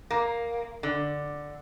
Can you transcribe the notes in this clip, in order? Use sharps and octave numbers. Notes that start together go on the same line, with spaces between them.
A#3
D3